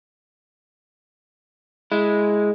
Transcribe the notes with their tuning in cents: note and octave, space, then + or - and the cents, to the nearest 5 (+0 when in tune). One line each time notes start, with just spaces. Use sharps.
G#3 +0 E4 +0